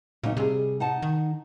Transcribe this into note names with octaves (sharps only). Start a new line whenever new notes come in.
A#2 C#3 F#3 D#4
C3 G3 G#4
D#4 F#5 A5
D#3